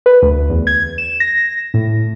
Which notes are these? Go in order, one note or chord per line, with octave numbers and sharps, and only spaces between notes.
B4
D2
E2
G#6
E7
A#6
A2